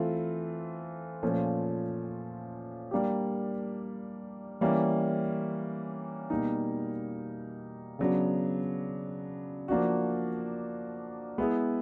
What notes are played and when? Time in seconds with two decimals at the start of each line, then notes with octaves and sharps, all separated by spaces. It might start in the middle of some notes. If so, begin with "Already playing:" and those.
Already playing: E3 A3 C4 F4
1.23 A#2 F3 A3 C#4
2.91 G3 A#3 D4 G4
4.61 E3 G3 A#3 C#4
6.30 B2 G3 A#3 D#4
7.99 C#3 F#3 B3 D4
9.68 F3 A#3 D4 F#4
11.38 G#3 B3 E4 G#4